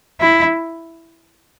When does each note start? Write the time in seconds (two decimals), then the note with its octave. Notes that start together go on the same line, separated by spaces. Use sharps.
0.21 E4